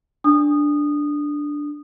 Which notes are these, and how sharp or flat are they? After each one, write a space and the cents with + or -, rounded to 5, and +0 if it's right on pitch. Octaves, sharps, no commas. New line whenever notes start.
D4 +0 D#6 -20